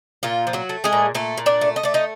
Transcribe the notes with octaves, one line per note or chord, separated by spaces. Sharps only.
A#2 F4
F3
F#3 F#4
A3
G#3 G#4
A#2
A#2 A3 A4
A#2
D4 D5
A3
D#5
A3 D5
D#4 D#5